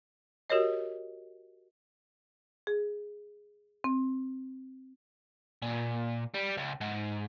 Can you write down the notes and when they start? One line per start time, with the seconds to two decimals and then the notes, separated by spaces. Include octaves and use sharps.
0.50 F#4 G4 A#4 C#5 D#5
2.67 G#4
3.84 C4
5.62 A#2
6.34 G3
6.57 C#2
6.81 G#2